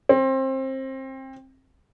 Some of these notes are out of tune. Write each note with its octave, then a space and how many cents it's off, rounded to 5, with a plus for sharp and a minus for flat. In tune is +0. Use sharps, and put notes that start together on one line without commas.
C4 +25